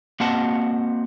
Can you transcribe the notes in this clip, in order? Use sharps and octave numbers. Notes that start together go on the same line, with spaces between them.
A#3 C4 F#4 D#5 F#5 A5